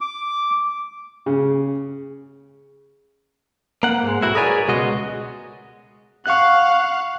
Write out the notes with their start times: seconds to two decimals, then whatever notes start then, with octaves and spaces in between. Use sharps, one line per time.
0.01 D6
1.26 C#3
3.83 A#3 F#5
4.04 G#2 G#3
4.21 B1 A2 E4 F#4
4.35 G#4 A#4 B4 C#5 D5 G#5
4.68 C#2 B2 G#3 F#4 D#5
6.26 F5 F#5 C#6 F#6